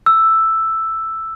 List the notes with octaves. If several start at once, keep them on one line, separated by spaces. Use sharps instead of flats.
E6